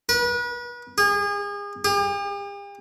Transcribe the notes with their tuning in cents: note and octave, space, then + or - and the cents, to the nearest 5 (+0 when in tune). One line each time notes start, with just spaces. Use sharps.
B4 -35
G#4 -35
G4 +45